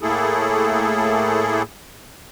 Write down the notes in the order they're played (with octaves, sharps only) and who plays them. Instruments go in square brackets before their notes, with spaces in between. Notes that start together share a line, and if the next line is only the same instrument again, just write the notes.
[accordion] A2 A3 A#3 E4 G#4 A4